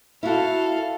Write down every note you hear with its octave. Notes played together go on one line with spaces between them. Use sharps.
E4 F#4 A4 F5